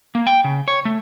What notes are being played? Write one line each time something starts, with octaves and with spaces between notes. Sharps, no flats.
A#3
G5
C#3
C#5
A3